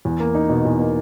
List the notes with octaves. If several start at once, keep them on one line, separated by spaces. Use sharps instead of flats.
E2
A#3
D#4
B2
E2
A#3